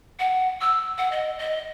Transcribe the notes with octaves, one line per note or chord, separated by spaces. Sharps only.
F#5
E6
F#5
D#5
D#5